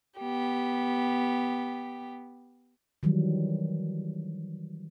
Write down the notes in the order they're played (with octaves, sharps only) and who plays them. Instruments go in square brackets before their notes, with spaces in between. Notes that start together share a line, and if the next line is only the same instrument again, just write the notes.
[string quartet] B3 G4
[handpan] D#3 E3 F#3 G3